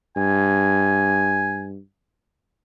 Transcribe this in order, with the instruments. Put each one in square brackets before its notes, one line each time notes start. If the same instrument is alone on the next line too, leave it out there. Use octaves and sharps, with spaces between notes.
[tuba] G2 [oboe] G#5